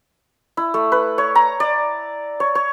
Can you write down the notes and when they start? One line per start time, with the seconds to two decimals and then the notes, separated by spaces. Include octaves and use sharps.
0.57 E4
0.74 A3
0.92 B4
1.18 C#5
1.35 A#5
1.60 D5
2.40 C#5
2.55 C#5